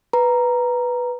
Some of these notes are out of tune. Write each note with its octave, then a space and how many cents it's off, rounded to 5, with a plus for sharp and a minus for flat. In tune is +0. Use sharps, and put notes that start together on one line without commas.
B4 +0 A#5 +0